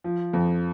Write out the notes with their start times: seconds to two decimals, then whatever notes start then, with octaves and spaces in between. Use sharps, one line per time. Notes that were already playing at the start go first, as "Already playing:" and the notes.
0.04 F3
0.33 F2